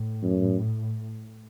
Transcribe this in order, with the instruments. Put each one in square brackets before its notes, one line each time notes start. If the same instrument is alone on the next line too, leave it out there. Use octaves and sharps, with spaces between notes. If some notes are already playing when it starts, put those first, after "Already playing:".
Already playing: [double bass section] A2
[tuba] F#2